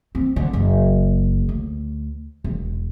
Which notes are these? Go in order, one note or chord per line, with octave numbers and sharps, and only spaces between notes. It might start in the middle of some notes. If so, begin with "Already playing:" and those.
C4
D3
F#1
D2
E1